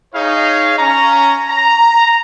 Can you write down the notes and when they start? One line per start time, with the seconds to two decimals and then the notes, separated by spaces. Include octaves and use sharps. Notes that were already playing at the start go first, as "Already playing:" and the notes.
0.13 D#4 G#4 C#5 F5
0.78 C#4 A#5
1.48 A#5